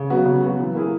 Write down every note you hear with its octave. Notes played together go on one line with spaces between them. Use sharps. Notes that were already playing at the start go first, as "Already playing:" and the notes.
Already playing: C#3
F#3 B3 F#4
C#3
F#3 B3 F#4
E3
A#3 E4 G#4